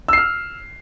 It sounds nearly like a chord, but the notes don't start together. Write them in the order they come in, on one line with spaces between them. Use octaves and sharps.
E6 C7 F6